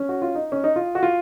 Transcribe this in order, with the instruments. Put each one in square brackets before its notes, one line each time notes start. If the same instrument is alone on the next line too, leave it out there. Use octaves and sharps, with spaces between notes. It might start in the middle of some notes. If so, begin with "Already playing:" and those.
Already playing: [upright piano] C#4
F#4
F4
D#4
C#4
D#4
F4
F#4
F4